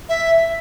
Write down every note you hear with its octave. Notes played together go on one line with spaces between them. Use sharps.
E5